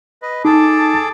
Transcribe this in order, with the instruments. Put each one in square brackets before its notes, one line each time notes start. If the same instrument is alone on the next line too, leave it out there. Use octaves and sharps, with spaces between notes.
[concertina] B4 D#5
[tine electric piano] D#4 [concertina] G#4 A4 D6 [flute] A5